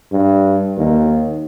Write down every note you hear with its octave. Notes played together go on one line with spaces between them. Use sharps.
G2
D#2